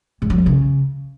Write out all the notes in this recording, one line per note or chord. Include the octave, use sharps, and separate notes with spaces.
G#2
F#3
F2
C#3